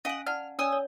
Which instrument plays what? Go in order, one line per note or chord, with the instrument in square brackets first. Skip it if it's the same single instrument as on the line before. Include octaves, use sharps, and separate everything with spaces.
[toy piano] C#4 F5 G#5 [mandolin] D#5 F#5
[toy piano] D5 F#5 A5 [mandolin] F6
[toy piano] C#4 C#5 D5 [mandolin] G#5 D#6 E6
[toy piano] C#5